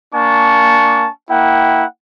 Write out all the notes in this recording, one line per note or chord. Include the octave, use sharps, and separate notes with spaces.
A#3 D4 G#5 A5 C#6
A#3 E4 F#5 G5